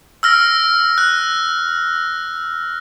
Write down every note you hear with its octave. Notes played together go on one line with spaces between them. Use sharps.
E6 F6 A#6
F#6